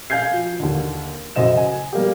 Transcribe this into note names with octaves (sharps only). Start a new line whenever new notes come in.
F5 G#5 G6 G#6 C7
F3
D#2 D3
A1 F#2 C#3 C5 D#5 E7
G#5
G3 A#3 B3 G4